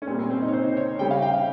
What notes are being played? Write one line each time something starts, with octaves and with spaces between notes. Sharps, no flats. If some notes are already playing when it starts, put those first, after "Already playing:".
C#4
A#2 G3 C4
C4
C4
D#4
C#5
C5
C#5
C#3 G3 G5
F5
G5
F5